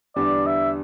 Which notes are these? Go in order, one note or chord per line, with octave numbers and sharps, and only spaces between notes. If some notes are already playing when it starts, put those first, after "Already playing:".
E2 D3 G3 D4 D5
E5